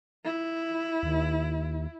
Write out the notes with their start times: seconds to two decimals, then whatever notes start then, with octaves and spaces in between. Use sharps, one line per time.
0.24 E4
1.03 D#2